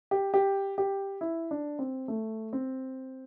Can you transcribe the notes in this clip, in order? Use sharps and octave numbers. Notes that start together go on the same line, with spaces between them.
G4
G4
G4
E4
D4
C4
A3
C4